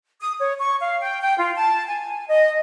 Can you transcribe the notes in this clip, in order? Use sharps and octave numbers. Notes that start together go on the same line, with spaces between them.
D#6
C#5
C#6
F5
G5
G5
F4
A5
G#5
D#5